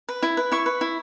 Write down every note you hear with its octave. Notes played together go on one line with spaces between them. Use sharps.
B4
E4
B4
E4 C#6
B4
E4